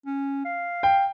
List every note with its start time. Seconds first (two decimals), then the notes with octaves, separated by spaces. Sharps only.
0.06 C#4
0.45 F5
0.83 G5